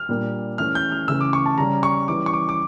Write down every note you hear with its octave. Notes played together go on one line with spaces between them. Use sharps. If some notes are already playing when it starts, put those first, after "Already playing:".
Already playing: F6
A#2 G3 A#3 D4
E3 A3 C#4 F6
G6
F6
C#3 E3 A3 C#4 E6
D6
C#6
A5
C#3 G3 C#4 A#5
C#6
E3 G3 C#4 D6
C#6
D6
D6